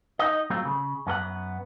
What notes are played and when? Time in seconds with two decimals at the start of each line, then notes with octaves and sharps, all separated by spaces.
0.19 D#4 D#5
0.50 F#3 A3 C4 F4
0.65 C#3
1.07 F#2 B3 A4 F#5